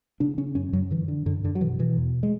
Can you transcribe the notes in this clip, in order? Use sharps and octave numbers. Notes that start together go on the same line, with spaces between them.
C#3 D4
C#3 C#4
F#2 C#4
F#2 F#3
D3 E3
D3
F#2 D3
F#2 D3
F#3
B2 E3
B2 E3
E2
G#3